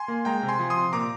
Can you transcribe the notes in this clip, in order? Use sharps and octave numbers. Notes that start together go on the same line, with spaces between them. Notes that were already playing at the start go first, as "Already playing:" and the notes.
Already playing: G#5 C6
A#3
G#3 G5 A#5
C3
G#5 C6
F3
C6 D#6
C3
A#2 A#5 D6